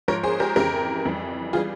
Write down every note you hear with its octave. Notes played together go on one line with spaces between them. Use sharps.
G#2 F3 A#4 C#5
G#4 C5
G4 A#4
F2 C#3 E3 G4 A#4
F2 E3 G3
E3 G3 F4 G#4